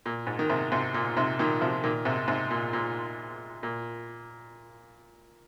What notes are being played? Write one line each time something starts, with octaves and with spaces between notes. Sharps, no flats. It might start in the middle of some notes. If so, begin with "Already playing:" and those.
A#2
G#2
D#3
G#2 C3
G#2 C3
A#2
G#2 C3
A#2 D#3
C3 F3
A#2 D#3
G#2 C3
G#2 C3
A#2
A#2
A#2